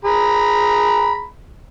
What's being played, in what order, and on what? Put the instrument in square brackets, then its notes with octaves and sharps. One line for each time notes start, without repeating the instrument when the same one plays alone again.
[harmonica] G#4 A#5 B5